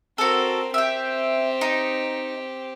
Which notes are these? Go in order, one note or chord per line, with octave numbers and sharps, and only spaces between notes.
C4 F#4 A4 A#4
C4 G4 E5 G5
D#4